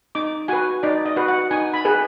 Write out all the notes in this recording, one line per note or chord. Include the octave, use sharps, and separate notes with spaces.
D#4 D6
F#4 B4 G#5
D#4 D5
D#5
F#4 B4
F#5
D#4 G#5
B5
G#4 B4